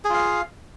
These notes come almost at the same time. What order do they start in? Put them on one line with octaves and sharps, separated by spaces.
G#4 F4 F5